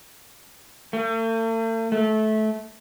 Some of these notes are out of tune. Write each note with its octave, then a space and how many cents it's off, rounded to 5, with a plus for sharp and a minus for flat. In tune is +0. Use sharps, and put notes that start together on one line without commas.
A3 +45
A3 -20